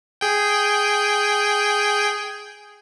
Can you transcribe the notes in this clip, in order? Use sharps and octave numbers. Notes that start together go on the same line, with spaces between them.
G#4 G5